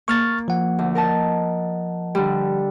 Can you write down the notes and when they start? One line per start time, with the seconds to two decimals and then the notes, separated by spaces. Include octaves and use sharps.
0.08 A#3 C#6 F6 A6
0.48 F3 F#5
0.79 D2
0.95 A#4 D#5 A5
2.15 D3 G3